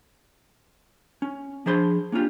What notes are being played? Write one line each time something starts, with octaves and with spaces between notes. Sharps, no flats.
C#4
F3 D4 G#4 C5 B5 C6
A#3 C#4 D4 F4 G4